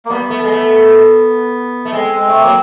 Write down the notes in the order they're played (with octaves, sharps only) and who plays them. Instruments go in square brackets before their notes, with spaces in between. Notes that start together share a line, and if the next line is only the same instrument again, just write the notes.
[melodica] A#3
[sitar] G3 [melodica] B3
[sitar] A3
G#3
A3
A3
[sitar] G#3 [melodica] C4
[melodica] G#3
A3
[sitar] F#3 [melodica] A#3